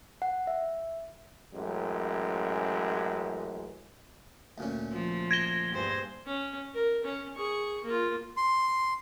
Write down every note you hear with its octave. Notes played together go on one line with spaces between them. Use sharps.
F#5
E5
A1 F#2 G#3
D2 A#2 C#4
F3
G#6 A#6 G7
G2 G#4 C5
C#4
A#4
C#4
G#4 C#6
A#3 F4
C6